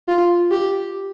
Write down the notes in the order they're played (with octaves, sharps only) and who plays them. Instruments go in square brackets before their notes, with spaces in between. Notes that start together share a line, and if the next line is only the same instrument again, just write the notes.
[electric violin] F4
G4